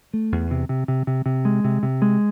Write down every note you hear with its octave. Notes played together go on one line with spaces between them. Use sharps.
A3
E2
C3
C3
C3
C3
C3
G#3
C3
C3
G#3